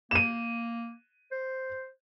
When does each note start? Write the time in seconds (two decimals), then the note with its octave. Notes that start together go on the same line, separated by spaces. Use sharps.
0.11 A#3 D#7 E7
1.31 C5